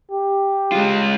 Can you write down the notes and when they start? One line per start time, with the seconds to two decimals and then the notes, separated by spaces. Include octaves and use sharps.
0.11 G4
0.72 G#3 F4